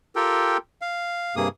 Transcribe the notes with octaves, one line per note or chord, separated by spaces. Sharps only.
F4 G4 A4 A#4 G5
F5
G2 C3 A#3 G#4 D#6